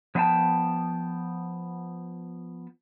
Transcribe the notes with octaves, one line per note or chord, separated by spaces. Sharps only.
F3 B3 C5 F5 G5 A5